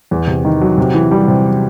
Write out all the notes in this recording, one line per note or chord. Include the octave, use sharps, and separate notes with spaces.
E2
C3
D#3
F#3
C3
E3
G3
C3